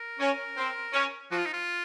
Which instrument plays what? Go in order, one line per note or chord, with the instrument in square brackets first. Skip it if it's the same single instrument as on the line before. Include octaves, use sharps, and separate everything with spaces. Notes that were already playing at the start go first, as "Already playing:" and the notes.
Already playing: [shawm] A#4
[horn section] C#4
C4
C#4
[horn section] F3 [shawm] F#4
[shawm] F4
D#4
F4